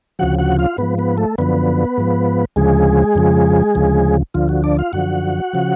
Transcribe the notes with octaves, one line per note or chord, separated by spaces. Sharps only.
D2 C#3 F3 F#4 F#5
F#4 F#5
F4 F5
G#2 F3 B3 B4
B3 B4
A3 A4
F#2 D3 F3 B3 B4
G#2 F3
D2 C#3 F3 G#3 G#4
F2 C#3 F3
D2 C#3 F3
D2 D3 F3 F4
F#4
D4 D5
F4 F5
F#2 D3 F3 F#4 F#5
C#3 F3